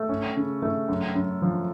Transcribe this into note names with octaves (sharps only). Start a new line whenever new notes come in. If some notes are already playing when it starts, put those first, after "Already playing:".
Already playing: A3
C#4
C#3
A3
F#2
F#2
F3